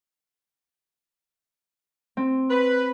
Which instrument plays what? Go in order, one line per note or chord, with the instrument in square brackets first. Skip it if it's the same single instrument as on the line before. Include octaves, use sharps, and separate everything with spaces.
[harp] C4
[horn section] B4